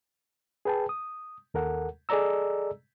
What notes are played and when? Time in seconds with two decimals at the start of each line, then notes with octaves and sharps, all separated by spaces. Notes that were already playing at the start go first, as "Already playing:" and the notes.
0.65 G#4 B4 G5 A5
0.89 D#6
1.54 D#2 A4 A#4 F#5
2.09 G#4 A4 D5 D#5 A#5 E6